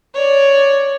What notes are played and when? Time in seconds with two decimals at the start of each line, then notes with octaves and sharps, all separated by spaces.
0.14 C#5 D5